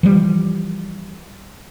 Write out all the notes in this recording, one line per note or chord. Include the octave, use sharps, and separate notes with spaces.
E3 F3 G3